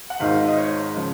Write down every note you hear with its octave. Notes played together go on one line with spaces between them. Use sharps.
F#5
G#1 G#2 D#3 F5
D#5
C#5
C#3 F3